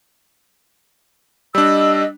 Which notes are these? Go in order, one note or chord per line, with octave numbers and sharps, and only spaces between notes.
G3 D4 D#5 E6